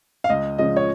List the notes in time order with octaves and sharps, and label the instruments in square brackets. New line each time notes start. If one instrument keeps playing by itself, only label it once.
[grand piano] F5
C#2 D#5
C#3 F3 G#3 C#4 D#5
C#5